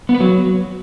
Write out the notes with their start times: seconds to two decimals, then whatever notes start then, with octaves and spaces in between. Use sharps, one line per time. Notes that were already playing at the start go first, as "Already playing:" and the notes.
0.09 B3
0.15 B4
0.20 F#3